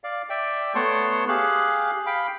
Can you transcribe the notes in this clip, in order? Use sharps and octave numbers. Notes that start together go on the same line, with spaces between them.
D5 F5
D5 E5 G5
A3 B3 C#5 F#5 A5 C6
G4 G#4 F5 F#6
F5 G5 B5